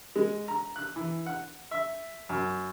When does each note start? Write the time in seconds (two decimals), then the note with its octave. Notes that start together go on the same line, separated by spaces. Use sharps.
0.16 G#3
0.48 A#5
0.76 F#6
0.96 E3
1.26 F#5
1.71 E5
2.29 F#2